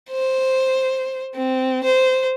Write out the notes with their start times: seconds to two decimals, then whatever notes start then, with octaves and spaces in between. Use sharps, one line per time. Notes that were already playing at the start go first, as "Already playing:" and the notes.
0.10 C5
1.35 C4
1.84 C5